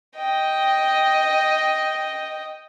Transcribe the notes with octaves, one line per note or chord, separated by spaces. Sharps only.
D#5 G5